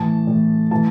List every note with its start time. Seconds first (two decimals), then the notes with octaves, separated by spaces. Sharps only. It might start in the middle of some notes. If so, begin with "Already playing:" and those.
Already playing: A2 E3 A5
0.27 A2 E3
0.71 A2 E3 A5